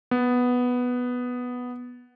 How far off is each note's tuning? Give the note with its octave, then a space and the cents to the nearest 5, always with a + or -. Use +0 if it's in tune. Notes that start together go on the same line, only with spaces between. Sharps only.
B3 +0